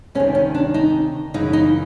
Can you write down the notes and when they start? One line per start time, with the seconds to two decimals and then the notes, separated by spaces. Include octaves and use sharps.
0.15 D2 C3 D#3 C#4
0.35 C#4
0.55 D4
0.74 D#4
1.34 F#2 C#3 E3 D#4
1.53 D#4